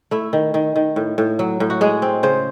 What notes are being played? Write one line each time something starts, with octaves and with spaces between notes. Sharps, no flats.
A3 E4
D#3
D#3
D#3
A2
A2
F#3
A2
F#4
G#3 G#4
C4
C#3 C5